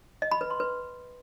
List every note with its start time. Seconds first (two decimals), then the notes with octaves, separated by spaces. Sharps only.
0.22 D#5
0.31 B5
0.41 B4
0.50 C6
0.60 B4